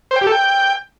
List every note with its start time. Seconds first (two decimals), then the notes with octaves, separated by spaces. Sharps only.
0.11 C5
0.16 G5
0.21 G4
0.27 A4
0.32 G5